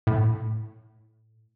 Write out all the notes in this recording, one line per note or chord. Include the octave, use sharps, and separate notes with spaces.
A2